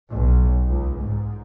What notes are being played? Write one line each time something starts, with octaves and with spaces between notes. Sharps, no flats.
B1
C#2
G#2